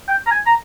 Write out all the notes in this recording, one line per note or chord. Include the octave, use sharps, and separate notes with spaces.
G5
A#5
G#5
A#5